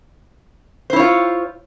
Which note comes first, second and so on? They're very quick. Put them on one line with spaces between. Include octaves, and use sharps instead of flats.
C5 E4 C#5 F4